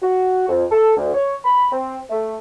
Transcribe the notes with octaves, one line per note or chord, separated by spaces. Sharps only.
F#4
F2
A4
D2
C#5
B5
C4
A3